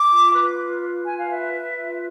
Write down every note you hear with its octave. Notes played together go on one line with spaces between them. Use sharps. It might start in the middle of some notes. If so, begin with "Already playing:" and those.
Already playing: D6
F4
B4
F4
B4
F4 G#5
F5
B4 E5
B4
F4